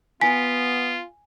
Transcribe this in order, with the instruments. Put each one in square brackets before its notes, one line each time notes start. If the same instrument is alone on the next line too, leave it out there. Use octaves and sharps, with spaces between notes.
[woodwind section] B3 [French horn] F4 [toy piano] G#5 [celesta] B6